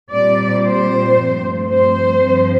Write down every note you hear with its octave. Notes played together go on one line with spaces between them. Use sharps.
A#2 G3 C4 D5
C5
G2 F3 A3 C4
C5
G2 F3 C4